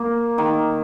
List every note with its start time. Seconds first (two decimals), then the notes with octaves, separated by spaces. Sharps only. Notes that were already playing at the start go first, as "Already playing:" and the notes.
Already playing: A#3
0.38 D#3